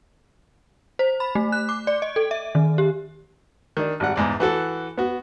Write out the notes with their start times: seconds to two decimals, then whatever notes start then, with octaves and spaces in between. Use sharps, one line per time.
0.99 C5
1.20 B5
1.35 A3
1.52 F#6
1.69 D6
1.87 D5
2.02 D#5
2.16 A4
2.31 E5
2.55 D#3
2.78 G4
3.77 D#3 D4
4.00 G#1 G3 F#5
4.16 E2 G#2 D5
4.40 E3 F#4 A4
4.98 B3 F#4